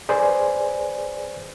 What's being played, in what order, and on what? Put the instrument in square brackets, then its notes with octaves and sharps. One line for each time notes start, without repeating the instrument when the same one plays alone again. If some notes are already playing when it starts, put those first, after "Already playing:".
[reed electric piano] G#4 B4 C5 D5 G#5